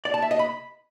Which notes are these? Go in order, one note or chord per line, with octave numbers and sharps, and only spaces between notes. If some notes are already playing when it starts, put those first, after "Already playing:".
D5
A5
E5
D#5
B5